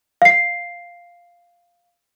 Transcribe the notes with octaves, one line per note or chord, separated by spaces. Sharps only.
F5 C7